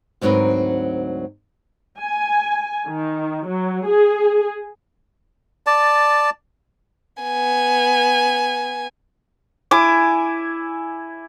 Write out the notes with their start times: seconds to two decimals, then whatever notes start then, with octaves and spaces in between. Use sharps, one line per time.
0.21 D2 G#2 F#3 C4 A#4 B4
1.99 G#5
2.87 D#3
3.47 F#3
3.85 G#4
5.66 D5 A5
7.23 B3 G#5
9.71 E4 G#5 D6